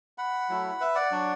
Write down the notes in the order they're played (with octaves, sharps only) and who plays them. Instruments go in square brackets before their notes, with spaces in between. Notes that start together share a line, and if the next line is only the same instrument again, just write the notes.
[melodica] F#5 B5
F#3 A3 E4
B4 E5
D5 F#5
F#3 D4 F#4